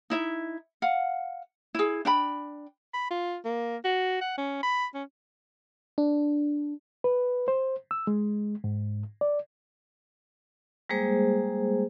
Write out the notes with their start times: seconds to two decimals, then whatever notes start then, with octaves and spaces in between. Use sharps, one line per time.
0.10 D#4 E4 E5
0.82 F5 F#5
1.75 E4 G#4
2.05 D4 G5 B5
2.94 B5
3.11 F4
3.45 A#3
3.85 F#4
4.21 F#5
4.37 C#4
4.63 B5
4.94 C#4
5.98 D4
7.04 B4
7.48 C5
7.91 E6
8.07 G#3
8.64 G#2
9.21 D5
10.89 G3 G#3 A#3 G#4 C5